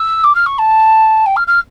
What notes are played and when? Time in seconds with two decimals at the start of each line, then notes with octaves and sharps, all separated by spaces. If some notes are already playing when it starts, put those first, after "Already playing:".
Already playing: E6
0.24 D6
0.35 F6
0.46 C#6
0.58 A5
1.26 G5
1.36 F6
1.47 F6